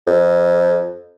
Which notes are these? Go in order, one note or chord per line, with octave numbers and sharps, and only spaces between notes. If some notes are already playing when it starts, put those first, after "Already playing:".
F2